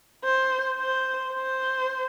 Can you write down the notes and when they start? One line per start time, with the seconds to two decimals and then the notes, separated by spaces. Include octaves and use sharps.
0.24 C5
0.79 C5
1.33 C5